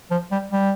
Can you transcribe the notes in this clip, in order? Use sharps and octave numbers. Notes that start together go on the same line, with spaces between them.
F3
G3
G3